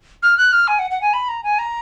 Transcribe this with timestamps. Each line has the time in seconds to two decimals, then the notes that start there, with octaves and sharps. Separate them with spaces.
0.23 F6
0.37 F#6
0.52 F6
0.68 G#5
0.79 F#5
0.91 F#5
1.01 G#5
1.13 B5
1.28 A#5
1.43 G#5
1.59 A#5